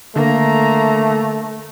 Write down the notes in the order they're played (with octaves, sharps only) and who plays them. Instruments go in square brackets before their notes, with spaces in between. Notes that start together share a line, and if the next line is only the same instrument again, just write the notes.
[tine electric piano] D3 [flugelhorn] A3 [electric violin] A#3 A#5